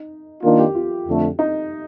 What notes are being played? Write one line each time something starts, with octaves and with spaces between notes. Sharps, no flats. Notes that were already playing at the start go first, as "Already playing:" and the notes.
Already playing: D#4
D#3 A#3 D4 F4 A#4
G4
F4
F2 D3 A3
D#4